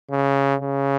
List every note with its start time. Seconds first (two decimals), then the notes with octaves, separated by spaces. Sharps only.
0.11 C#3
0.61 C#3